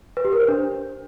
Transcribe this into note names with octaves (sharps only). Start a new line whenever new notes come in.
B4
G4
A#4
C5
D4